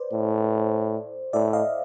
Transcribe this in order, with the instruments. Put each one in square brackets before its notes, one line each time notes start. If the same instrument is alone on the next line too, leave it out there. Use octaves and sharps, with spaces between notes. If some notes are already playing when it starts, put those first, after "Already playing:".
Already playing: [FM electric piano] B4 C5 D5
[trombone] A2
[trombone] A2 [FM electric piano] D5 E5
[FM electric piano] D#5 F5